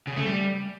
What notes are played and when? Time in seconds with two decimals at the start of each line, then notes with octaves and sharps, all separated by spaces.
0.07 C#3
0.16 A3
0.26 G3